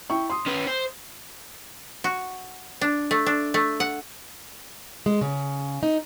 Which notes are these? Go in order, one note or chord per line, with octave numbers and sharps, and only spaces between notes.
E4 G5 C#6
C6 D#6
C#4 B4
C5
F#4
D4
A3
D4
A3
F#5
G#3
C#3
D#4